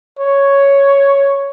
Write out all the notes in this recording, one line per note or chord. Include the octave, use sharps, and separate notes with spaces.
C#5